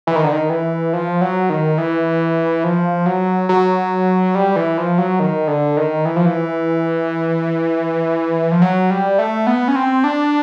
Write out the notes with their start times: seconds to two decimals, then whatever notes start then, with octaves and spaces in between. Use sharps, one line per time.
0.07 E3
0.16 D#3
0.24 D3
0.32 D#3
0.50 E3
0.93 F3
1.21 F#3
1.50 D#3
1.78 E3
2.64 F3
3.06 F#3
3.49 F#3
4.35 G3
4.56 E3
4.78 F3
4.98 F#3
5.20 D#3
5.48 D3
5.77 D#3
6.05 E3
6.16 F3
6.26 E3
8.52 F3
8.62 F#3
8.90 G3
9.19 A3
9.47 B3
9.68 C#4
9.76 C4
10.04 D4